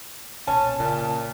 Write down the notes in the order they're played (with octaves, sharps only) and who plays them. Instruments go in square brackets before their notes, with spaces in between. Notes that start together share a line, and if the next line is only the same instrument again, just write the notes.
[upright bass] B1 A#2 [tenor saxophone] C#4 [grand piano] A5
[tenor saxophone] A#2 [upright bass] C#3